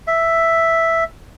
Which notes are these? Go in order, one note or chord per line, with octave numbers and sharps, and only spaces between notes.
E5